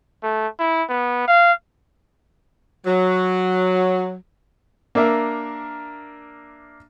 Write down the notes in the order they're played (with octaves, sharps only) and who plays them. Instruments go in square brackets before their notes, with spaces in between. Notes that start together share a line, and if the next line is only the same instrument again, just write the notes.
[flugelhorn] A3
E4
B3
F5
[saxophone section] F#3
[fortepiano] A#3 D4 A#4 E5